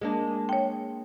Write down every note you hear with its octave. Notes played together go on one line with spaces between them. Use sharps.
G#3 A#3 D4
C#5 G5